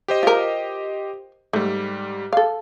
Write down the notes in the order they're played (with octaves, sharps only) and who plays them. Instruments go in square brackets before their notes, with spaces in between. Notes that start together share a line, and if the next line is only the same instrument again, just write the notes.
[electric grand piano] G4 C5 D#5
[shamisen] F4 A#4
[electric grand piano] G#2 G3 [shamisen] A3
[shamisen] A4 F5